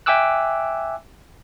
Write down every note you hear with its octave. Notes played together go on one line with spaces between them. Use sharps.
E5 G5 G#5 D6 E6 F#6